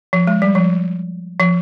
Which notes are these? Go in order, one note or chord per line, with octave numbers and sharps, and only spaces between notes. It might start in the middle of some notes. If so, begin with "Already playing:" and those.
F3
G#3
G3
F3
F3